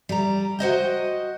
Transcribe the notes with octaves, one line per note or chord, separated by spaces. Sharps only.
G3 A#5
F#4 C5 D#5 G5